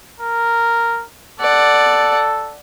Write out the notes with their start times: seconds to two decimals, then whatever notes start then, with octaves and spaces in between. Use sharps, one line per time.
0.20 A#4
1.40 A4 D5 F#5